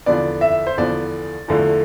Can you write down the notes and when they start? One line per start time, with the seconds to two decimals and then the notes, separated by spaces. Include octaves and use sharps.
0.06 E2 D3 F3 B3 D4 D5
0.41 E5
0.67 C5
0.77 E2 D3 F3 B3 D4 D5
1.48 E2 D3 F3 A3